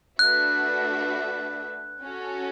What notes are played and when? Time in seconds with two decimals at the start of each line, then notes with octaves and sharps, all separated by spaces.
0.19 A3 D4 F#4 B4 E5 F#6
2.02 C#4 F#4 A4